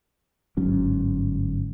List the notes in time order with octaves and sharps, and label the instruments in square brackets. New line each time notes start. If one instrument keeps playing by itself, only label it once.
[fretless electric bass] G1 G#2 F#3 C#4